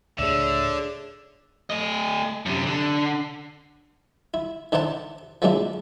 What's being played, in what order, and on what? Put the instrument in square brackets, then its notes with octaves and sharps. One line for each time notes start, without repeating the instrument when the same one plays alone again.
[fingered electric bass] C#2 A2 D4 [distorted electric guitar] D3 [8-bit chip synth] G#4 C#5 D5 [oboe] E5
[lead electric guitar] A3 D#5
F#2 C3
D3
[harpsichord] E4
D#3 D4 E4 C5 F#5 A5
F3 F#3 G#3 A#3 D4 E4